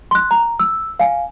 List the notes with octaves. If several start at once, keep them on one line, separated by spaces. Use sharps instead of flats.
C6 F#6
A#5
E6
F5 G#5